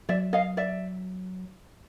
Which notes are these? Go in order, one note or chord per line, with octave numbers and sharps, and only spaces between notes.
F#3 D5 E5
D#5 F5
D5 E5